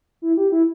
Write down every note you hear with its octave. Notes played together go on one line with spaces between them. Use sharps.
E4
G4
E4